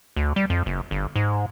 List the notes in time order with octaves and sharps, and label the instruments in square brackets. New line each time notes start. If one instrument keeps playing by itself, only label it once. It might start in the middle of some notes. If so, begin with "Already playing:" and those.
[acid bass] D2
G3
F2
F#1
G1
G#2